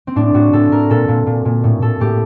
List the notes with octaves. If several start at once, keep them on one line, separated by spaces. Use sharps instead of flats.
C4
A2 D4
A2 F#4
A2 A4
A2 A#4
A#2 A4
A#2
A#2
A#2
A2
A2 A4
A2 G4